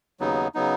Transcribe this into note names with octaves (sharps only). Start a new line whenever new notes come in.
D#2 C#3 F#3 B3 D#4
C#3 F#3 B3 D#4